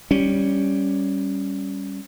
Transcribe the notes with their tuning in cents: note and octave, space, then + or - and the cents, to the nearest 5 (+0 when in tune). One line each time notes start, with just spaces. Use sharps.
G3 +0 C#4 +0